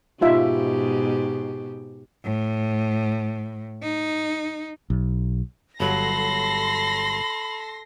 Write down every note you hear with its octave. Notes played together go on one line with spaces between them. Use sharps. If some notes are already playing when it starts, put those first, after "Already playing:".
G#2 B2 D#4 F4 G4 E5
A2
D#4
B1
G1 F#3 A4 B5 C6 A#6